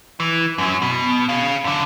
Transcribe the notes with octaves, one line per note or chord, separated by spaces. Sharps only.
E3
F#2 F#3
B2
G#4 F5
F#2 D3